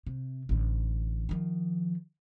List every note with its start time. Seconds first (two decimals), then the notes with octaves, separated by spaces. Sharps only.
0.07 C3
0.49 A1 D3
1.29 D#3 F3